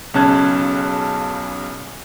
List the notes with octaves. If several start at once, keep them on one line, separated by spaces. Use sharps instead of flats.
B1 C#3 C#4 A5 F#6 G#6